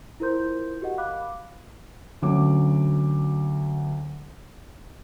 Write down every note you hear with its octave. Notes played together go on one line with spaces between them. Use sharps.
E4 F4 A#4 C5 C6 G6
F#4 G4 A#4 D#5 F#5
F5 B5 D6 F#6
D2 D3 F#3 C#4 D6